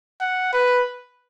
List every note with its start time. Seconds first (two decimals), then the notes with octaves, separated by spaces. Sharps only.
0.21 F#5
0.53 B4